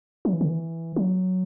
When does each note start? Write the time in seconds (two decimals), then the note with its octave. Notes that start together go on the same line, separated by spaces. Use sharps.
0.25 F#3
0.33 E3
0.41 D3
0.49 E3
0.96 F#3